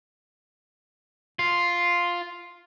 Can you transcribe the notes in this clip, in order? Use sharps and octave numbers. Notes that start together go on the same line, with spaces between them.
F4